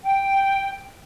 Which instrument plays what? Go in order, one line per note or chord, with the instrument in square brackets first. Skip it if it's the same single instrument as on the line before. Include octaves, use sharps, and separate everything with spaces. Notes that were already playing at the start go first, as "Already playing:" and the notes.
[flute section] G5